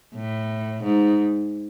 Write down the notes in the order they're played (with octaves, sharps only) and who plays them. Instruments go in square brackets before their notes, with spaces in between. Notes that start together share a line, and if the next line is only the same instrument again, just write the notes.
[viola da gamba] A2
G#2